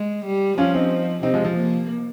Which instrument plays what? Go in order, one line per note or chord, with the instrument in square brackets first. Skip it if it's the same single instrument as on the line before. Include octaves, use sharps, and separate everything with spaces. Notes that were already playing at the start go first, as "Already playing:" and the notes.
Already playing: [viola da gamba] G#3
G3
[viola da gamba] F3 [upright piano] C#4 F4
[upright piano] C4 D#4
[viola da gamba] C3 [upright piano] C4 D#4
[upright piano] F3 G#3
F3
[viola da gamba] A#3